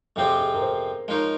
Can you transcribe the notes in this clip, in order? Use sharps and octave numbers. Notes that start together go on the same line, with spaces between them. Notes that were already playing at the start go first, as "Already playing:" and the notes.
F2 C3 F3 C4 G4 G#4
G#4
A#4
C5
F3 G#3 D#4 A#4 C#5